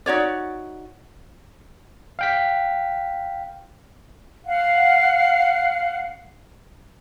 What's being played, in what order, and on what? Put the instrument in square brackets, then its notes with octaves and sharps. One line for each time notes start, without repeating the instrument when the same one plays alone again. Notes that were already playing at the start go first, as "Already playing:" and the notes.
[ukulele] D#4 F#4 C#5 D5
[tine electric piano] F5 G5 B6
[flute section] F5 F#5